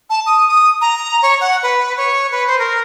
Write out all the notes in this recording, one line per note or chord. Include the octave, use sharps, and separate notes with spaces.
A5
D#6
D#6
A#5
C#5
F#5
B4
C#5
B4
C5
A#4